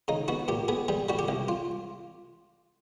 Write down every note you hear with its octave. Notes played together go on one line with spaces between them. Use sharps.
C#3 D#4
B3 F#4
A#2 G4
B3 G#4
G3 G#4
G3 F#4
G4
C2
F4